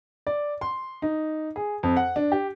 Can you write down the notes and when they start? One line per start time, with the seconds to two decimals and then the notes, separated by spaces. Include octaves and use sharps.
0.27 D5
0.61 C6
1.02 D#4
1.56 G#4
1.83 F2
1.97 F#5
2.16 D4
2.32 G4